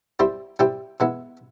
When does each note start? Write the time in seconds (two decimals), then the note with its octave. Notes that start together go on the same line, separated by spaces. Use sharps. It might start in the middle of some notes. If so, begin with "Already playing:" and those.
0.19 G3 C4 E4 G4 C5
0.59 G3 C4 E4 G4 C5
1.00 E3 G#3 B3 E4